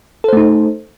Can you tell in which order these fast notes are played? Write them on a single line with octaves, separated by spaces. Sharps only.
A4 C5 A3 D#4